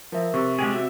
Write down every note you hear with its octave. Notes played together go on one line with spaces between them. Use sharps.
F3 A#4 E5
C3 C#6
G#3 G4 G#4
C4 F#4 E5